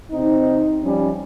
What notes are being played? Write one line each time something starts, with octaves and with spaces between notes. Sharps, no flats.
C3 C4 D#4
F3 G3 C#4